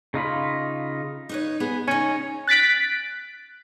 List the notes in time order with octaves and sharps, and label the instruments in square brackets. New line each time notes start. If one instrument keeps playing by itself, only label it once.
[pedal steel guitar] C#3 D#4 F4 B5
[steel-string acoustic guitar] D#4 B4 C#5
B3 G#4 B4
[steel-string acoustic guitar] C#3 D#4 [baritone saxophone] C#4
[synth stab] F#6 A6 B6 D7